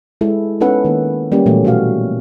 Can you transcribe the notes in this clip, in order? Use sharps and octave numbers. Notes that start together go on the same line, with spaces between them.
G#3 E4 A4
B3 C#4 D#4 A4 B4 F#5
D#3 A#3
G3 A#3 C#4 G4
A#2 E3 F#3 A3 B3
B2 A3 F#4 F5